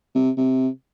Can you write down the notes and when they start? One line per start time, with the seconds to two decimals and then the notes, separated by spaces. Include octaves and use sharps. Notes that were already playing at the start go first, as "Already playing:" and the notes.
0.14 C3
0.37 C3